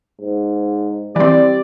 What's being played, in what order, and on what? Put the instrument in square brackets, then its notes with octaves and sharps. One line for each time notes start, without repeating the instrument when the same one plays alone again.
[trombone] G#2
[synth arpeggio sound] E3 C4 [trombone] G3 [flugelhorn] D5